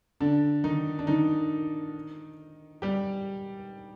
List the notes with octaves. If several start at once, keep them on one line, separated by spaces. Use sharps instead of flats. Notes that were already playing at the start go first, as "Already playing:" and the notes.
D3 D4
D#3 D#4
D4
D#3 D#4
G3 G4